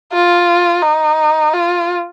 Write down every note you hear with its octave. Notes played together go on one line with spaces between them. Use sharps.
F4
D#4
F4